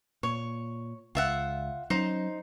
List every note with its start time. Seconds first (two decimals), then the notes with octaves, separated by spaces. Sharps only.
0.23 A#2 C#5
1.15 C#2 F4 E5 F#5
1.90 F#3 C#4 D#4 C5 C6